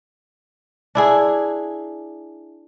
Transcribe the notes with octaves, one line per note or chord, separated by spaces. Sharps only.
D4 E4 G#4